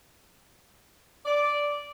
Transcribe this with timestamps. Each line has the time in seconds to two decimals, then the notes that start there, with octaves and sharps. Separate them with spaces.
1.26 D5